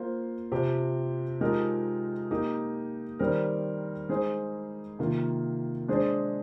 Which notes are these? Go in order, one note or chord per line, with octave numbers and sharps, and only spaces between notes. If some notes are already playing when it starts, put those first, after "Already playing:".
Already playing: A#3 F4 C5
C3 F3 C4 G4
F3 G#3 D#4 G4 A#4
A#3 D#4 G4
D#3 G3 C4 G4 A#4
G#3 D#4 G#4 C5
C3 D#3 A#3 F4
G#3 D4 G#4 C5